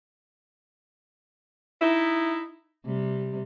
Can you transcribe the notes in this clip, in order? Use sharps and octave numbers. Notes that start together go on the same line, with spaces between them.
D#4 E4
C3 G3